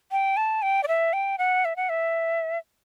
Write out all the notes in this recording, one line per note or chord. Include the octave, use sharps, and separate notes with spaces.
G5
A5
G5
D5
E5
G5
F#5
E5
F#5
E5